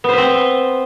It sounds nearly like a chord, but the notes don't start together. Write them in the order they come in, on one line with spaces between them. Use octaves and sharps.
B3 C5 B4 C4